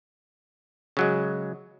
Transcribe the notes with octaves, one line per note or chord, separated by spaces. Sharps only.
C#3 F#3 G#3